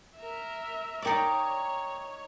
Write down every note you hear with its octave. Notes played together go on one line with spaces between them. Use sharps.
A#4 E5
D#4 A#4 C#5 D5 E5 G5